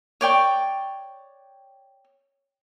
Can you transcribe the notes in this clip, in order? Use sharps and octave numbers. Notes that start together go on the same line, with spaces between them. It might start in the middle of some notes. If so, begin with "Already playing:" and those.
C#5 D5 G5 C#6